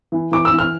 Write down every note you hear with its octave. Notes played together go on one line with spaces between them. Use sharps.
E3
E3 D6
E6
E3
F6